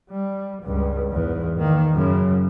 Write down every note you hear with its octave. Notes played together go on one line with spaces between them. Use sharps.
G3
C#2 G2
E2 G#2
D#3 A#3
F#2 C#3